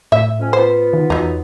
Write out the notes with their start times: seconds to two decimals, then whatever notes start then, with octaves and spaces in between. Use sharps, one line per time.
0.12 A2 E5
0.39 F2 C#4
0.53 B3 F4 C5
0.93 D#3
1.10 E2 F#3 D#4